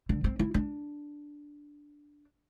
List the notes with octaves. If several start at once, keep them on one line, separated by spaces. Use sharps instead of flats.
D3
C4
E4
D4